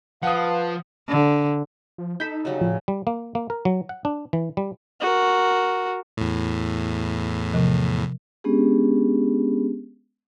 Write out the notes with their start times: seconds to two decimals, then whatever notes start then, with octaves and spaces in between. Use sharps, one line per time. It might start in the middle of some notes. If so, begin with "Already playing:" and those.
0.23 F3 B4 F5 F#5 A5 D#6
1.08 D3
1.98 F3
2.20 D#4 A4 B5 G6 B6 E7
2.45 C#3 F#3 G3
2.61 A2 F3
2.88 G3
3.07 A#3
3.35 A#3
3.50 A#4
3.65 F#3
3.89 F#5
4.05 D4
4.33 E3
4.57 G3
5.01 F#4 A#4
6.17 E2 A2
7.54 C3 F3
8.44 G#3 B3 C#4 D4 G4 G#4